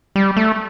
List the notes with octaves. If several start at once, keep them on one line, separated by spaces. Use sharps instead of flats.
G3
A3